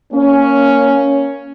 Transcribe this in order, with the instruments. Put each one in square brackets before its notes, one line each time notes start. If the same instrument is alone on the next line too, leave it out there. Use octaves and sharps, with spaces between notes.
[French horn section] A#3 C#4